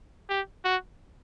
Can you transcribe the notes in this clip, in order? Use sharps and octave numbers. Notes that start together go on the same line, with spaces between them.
G4
F#4